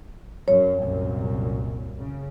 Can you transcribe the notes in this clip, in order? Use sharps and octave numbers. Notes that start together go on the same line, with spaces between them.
F#2 C#5
C2 F#2 A#2
C#3